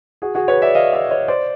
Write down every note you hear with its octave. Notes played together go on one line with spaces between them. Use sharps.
F#4 G#4
F#4 G#4
B4 C#5
D5 E5
D#5 F5
D5 E5
C#5 D#5
C5 D5